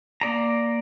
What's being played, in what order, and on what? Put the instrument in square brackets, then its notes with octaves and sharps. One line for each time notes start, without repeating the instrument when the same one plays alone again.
[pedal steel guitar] A#3 D5 A#5